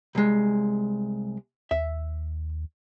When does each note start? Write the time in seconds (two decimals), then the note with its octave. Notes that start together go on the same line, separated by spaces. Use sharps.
0.15 C2 G#3
1.71 D#2 E5